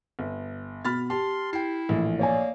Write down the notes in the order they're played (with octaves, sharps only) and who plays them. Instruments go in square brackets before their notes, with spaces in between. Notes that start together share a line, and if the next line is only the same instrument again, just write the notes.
[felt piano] G1
[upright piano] B2 [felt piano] B5 F6 A6
[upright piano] G4 [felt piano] A5 [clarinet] C6
[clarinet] E4 [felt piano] G5 C7
[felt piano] A#1 [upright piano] A2 E3
[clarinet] A#3 [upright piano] C#5 D5 G#5